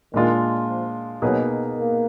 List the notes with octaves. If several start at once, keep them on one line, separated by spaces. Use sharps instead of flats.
A#2 D#3 G#3 D4 F4
F3
B2 F#3 A#3 D#4 G#4 B4
A#3